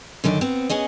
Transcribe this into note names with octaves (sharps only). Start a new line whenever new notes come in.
F#2 D3 D#3 D4
B3 C4
B3 C#4 G#4 D#5